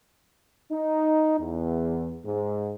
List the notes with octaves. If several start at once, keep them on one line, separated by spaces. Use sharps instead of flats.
D#4
E2
G#2